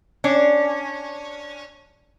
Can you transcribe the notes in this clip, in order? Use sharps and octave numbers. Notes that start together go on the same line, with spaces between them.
C#4 D4